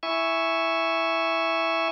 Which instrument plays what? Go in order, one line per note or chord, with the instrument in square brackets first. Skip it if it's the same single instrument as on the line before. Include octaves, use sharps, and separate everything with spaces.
[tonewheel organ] E4 E5 G#5 C#6